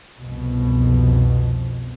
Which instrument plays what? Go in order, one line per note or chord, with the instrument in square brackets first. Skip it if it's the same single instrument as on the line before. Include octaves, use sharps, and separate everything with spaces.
[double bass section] C2 F2 B2